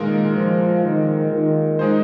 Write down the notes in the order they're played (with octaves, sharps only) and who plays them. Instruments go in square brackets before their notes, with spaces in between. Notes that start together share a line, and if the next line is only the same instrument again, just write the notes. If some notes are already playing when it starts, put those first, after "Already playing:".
Already playing: [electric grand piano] A#2 G#3 F4 A#4 [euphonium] D#3
[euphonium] F3
D#3
D#3
[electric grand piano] G#3 D#4 G#4 C5